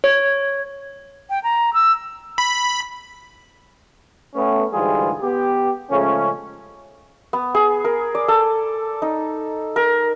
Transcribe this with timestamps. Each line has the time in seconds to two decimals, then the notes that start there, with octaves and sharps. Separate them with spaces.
0.04 C#5
1.30 G5
1.44 A#5
1.74 E6
2.38 B5
4.35 A3 B3 C#4
4.73 D2 G#2 E3 G3 F4 G#4
5.22 B3 G4
5.91 C#3 F3 G#3 A3 C#4
7.33 B3
7.55 G#4
7.85 A#4
8.15 D5
8.28 A4
9.02 D#4
9.76 A#4